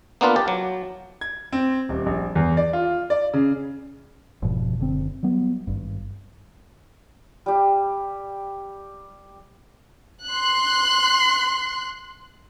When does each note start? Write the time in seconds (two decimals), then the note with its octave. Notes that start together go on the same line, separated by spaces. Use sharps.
0.21 A#3 B3 D4 F4 B4
0.36 G4 A5
0.48 F#3
1.21 G#6
1.53 C4
1.89 D#1
2.06 A#1
2.36 E2
2.57 D5
2.73 F4
3.10 D5
3.34 C#3
4.42 F1 G#2 B2 F3
4.78 F#1 D3 C4
5.23 F#3 G3 B3
5.67 G#1 G2
7.46 G3 G4
10.27 C6 F#6